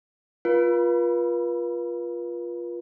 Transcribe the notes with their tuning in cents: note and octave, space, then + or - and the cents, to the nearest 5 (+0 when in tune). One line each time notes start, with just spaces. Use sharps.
F4 +0 B4 -40